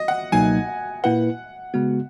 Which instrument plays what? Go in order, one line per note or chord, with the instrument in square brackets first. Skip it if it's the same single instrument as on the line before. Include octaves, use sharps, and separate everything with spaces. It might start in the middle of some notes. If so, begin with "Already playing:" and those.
Already playing: [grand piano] D#5
F#5
[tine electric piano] C#2 B2 F#3 A#3 D#4 [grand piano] G#5
[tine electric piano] A#2 A#3 E4 B4 [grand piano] F#5
[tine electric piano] C#3 G#3 B3 F#4